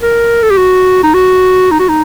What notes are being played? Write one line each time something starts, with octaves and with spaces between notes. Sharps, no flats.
A#4
A4
G4
F#4
D#4
F#4
D#4
F#4
D#4